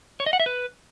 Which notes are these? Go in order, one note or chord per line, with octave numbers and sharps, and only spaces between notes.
C#5
D#5
F#5
E5
B4